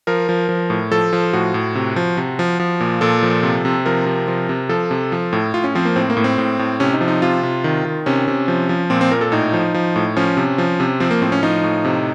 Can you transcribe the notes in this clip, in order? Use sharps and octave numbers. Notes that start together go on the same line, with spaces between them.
F3 A#4
F3
F3
A2
F3 A4
F3
A2 F#4
A2
C3
F3
C3
F3
F3
A#2
A#2 A4
F3
C3
C3
F3 A#4
C3
F3
C3
F3 A4
C3
F3
A2
A2 F4
C#4
F3 C4
A#3
A2 C4
A#3
A2
C4
A2
A2
C3 C#4
D#4
F3
D#4
C3 F4
C3
D#3
D#3
C3 C#4
C3
F3
F3
A#2 C4
C4
A#2 A#4
A4
A2 D#4
F3
F3
A2
F3 C#4
C3
F3
C3
F3 C4
A#3
A2 C4
C#4
F3 D#4
A2
C3